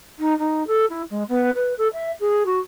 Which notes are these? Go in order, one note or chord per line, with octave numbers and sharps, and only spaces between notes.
D#4
D#4
A4
E4
G#3
B3
B4
A4
E5
G#4
F#4